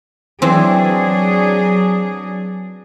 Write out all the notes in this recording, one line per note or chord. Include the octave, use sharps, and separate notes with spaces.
E3 F#3 C4 D4 G#4